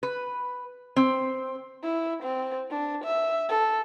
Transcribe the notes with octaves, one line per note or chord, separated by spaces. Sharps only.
B4
C4
E4
C4
D4
E5
A4